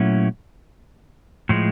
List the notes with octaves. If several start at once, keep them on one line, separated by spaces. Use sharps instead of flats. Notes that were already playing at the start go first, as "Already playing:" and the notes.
Already playing: A#2 F#3 A3 C#4 E4
A2 F3 G#3